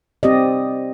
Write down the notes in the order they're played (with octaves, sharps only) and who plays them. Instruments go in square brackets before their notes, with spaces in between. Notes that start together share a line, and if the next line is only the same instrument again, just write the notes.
[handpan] C4 G4 D5 D#5